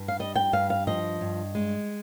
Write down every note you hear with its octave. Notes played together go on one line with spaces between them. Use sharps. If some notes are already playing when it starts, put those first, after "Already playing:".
Already playing: G2
F5
G3 D#5
G5
G2 F5
F5
F3 D#5
G2
G#3